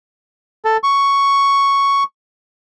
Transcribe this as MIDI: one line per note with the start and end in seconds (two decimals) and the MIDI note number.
0.65 0.77 69
0.84 2.03 85